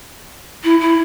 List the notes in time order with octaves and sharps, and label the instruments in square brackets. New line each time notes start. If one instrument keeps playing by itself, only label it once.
[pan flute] E4
E4